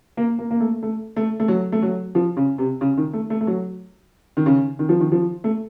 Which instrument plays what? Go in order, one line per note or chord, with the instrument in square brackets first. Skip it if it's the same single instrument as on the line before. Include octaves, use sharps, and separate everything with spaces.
[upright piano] A#3
A#3
A#3
A3
A3
A3
A3
F#3
A3
F#3
F3
C#3
C3
C#3
D#3
A3
A3
A3
F#3
D#3
C#3
D#3
F3
D#3
F3
A3